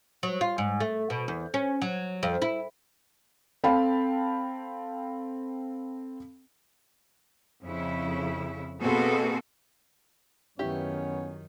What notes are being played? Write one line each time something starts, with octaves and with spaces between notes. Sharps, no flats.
F#3
F4
G#2
A3
B2
E2
C#4
F#3
F2
E4
C4 A4 F5 G5 A5 B5
F2 C#3 E4
B2 A#3 C4 F#4 G#4 A4
F#2 D#3 B3 C#4 E4 G4 C#5